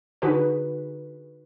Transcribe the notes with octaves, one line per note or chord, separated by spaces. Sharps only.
D3 D#4 F#4 G#4 B4